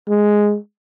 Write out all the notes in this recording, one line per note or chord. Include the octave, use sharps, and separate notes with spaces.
G#3